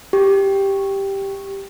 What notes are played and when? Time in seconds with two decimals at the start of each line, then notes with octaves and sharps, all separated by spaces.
0.13 G4